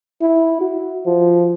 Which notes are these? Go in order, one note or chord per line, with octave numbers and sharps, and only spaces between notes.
E4
F#4
F3